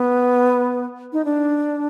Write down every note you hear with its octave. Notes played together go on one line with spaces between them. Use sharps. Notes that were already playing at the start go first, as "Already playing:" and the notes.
Already playing: B3
D#4
D4